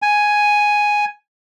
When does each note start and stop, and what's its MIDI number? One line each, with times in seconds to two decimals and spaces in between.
0.02 1.05 80